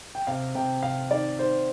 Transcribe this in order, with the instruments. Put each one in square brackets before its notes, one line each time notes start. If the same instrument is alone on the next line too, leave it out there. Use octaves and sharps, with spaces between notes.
[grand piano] G5
C3 F5
C3 G5
C3 F5
D#3 D5
D#3 C5